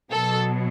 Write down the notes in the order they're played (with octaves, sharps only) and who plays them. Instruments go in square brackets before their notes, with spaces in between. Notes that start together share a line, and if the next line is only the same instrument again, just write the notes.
[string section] B2 F#3 A4